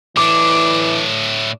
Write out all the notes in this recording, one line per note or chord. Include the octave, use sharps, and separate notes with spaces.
A2 E3 D4 D6